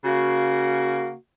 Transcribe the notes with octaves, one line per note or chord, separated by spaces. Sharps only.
C#3 A#3 F#4